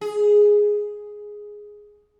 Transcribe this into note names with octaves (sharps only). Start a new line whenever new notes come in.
G#4